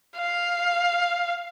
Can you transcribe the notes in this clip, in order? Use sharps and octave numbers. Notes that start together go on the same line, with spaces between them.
F5